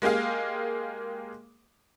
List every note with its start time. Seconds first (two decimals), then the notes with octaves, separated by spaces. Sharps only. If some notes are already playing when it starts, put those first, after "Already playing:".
0.02 G#3 A#3 G4 G#4 F5